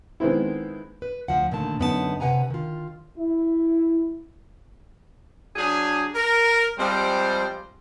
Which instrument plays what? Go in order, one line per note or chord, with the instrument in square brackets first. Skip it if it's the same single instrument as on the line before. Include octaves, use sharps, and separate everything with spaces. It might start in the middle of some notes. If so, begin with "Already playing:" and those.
[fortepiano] D#3 G#3 B3 C4 E4
[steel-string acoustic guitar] B4
D2 C#3 F3 F#5
A#2 D3 D#3 A3 A5
F#2 D3 B3 D#4 F#4 A5
C3 B4 F#5 G#5 A#5
D#3 F4
[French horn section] E4
[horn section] F#3 D4 G4 G#4
A#4
F3 G3 G#3 C4 C5